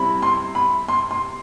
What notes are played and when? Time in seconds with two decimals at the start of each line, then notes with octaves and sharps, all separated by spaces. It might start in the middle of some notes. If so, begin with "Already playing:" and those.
Already playing: C3 G3 C4 E4 B5
0.22 C6
0.55 B5
0.88 C6
1.11 C6